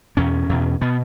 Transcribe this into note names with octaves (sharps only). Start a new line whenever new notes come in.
E2 B2 C#4
E2 B2
B2 B3